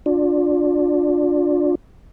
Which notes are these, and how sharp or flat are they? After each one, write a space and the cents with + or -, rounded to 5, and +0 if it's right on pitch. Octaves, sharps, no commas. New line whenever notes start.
D4 +0 F4 +30 D5 +0